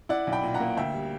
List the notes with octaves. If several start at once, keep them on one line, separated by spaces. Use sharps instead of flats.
E4 D5 F#5
B1
G5 B5
A#2
F#5 A#5
A#3
D2 E5 G5
G3